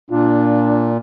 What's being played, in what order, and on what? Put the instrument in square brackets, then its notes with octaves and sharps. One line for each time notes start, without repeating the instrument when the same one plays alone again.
[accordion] A#2 [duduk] D4 [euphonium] F4